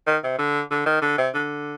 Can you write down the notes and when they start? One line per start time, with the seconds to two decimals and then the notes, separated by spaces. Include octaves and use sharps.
0.07 D#3
0.24 C3
0.39 D3
0.71 D3
0.86 D#3
1.02 D3
1.18 C3
1.34 D3